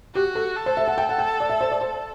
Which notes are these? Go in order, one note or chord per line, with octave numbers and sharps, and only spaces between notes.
F#4 G4
A4
A4
C5
E5
F#5
G5
F#5
G5
D5
E5
C5
D5
C5